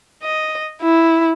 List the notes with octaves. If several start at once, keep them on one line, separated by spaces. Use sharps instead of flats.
D#5
E4